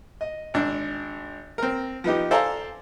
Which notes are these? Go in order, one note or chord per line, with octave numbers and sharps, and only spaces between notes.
D#5
G#1 D4
C4 A#4
F3 B3 D#4 G4
A4 C5 D5 F5 G#5 A#5